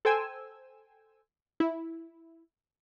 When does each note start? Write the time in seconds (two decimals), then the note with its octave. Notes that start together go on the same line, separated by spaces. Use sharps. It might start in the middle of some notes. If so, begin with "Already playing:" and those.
0.05 A4 C5 G5 G#5 E6
1.60 E4